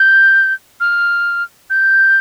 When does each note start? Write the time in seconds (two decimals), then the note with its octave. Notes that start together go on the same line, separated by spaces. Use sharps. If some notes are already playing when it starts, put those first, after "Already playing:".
Already playing: G6
0.80 F6
1.70 G6